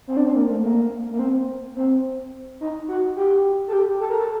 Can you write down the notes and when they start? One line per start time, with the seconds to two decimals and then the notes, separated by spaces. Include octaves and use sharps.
0.08 C4
0.17 D4
0.25 C4
0.36 A#3
0.50 A3
0.64 A#3
1.12 A#3
1.19 C4
1.76 C4
2.61 D#4
2.88 F#4
3.16 G4
3.68 A4
3.73 G4
4.00 A4
4.10 A#4
4.19 A4